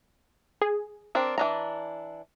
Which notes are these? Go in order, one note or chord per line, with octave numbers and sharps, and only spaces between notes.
G#4
C4 D4 A#4
E3 D4 A#5